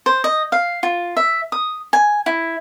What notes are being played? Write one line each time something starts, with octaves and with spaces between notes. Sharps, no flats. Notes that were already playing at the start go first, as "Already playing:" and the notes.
C5
D#5
F5
F4
E5
D#6
G#5
E4